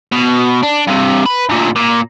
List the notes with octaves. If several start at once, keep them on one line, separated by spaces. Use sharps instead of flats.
B2
D4
G2 C3
B4
D2 A#2
A#2